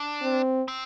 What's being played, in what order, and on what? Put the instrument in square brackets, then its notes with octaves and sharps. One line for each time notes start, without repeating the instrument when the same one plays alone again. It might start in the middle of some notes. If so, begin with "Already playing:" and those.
Already playing: [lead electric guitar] D4
[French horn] C4
[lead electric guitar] C4